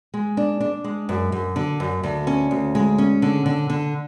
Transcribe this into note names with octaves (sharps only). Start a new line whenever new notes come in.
G#3
D4
D4
G#3
F#2
F#2
D3
F#2
D2
C#4
D2
G#3
C#4
D3
D3
D3